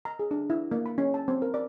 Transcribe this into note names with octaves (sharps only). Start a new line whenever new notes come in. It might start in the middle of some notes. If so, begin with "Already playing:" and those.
A#5
G#4
D4
E4
A#3
B5
C#4
A5
C4
A#4
D5